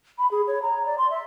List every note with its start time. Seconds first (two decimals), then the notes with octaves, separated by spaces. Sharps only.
0.19 B5
0.31 G#4
0.47 C#5
0.62 A#5
0.86 D5
0.98 C6
1.10 E5